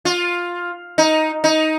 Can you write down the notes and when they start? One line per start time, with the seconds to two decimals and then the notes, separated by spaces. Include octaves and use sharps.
0.05 F4
0.98 D#4
1.44 D#4